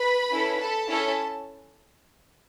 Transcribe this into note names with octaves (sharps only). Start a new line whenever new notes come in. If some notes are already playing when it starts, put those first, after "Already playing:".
Already playing: B4 B5
C#4 E4 A4
A4 A5
C#4 E4 A4